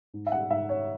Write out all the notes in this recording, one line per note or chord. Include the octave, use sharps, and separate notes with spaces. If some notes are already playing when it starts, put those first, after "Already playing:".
G#2
E5
F#5
G#2 E5
C#5